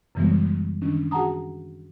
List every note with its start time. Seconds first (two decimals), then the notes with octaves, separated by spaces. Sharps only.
0.15 F#2 C#3 E3 G3 G#3 B3
0.82 D#3 C#4 D4
1.11 F#4 G#4 F#5 A5 A#5 D#6